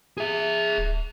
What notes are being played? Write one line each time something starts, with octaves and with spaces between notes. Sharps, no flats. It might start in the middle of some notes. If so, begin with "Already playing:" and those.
G#4 E5
D1